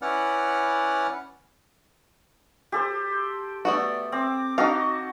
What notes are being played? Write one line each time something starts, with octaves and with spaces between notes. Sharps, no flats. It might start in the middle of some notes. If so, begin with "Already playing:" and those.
C#4 E4 B4 D5 F#5 F6
G4 A4 C5
C6
A3 B3 F#4 D5
C4 D6
D#4 F#4 D#5 F5 A5